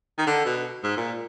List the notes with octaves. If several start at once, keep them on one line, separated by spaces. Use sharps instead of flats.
D#3
D3
B2
G#2
A#2